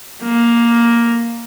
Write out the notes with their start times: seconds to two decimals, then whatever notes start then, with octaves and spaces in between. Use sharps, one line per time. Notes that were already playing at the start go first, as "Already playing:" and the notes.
0.23 A#3